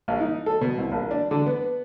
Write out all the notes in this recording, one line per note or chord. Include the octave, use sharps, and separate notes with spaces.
A#1
D#4
A4
B2
C2
A#1
D4
D3
B3